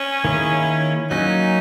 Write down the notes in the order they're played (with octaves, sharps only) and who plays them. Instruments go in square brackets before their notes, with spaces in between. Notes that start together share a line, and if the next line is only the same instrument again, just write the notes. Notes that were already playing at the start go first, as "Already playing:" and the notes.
Already playing: [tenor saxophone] C#4
[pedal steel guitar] D#3 A#3 E4 G#4 C#5
[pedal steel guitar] F#3 A#3 C#4 [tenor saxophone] D#4